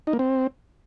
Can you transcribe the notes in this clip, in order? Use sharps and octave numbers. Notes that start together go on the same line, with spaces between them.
D#4
A#3
C4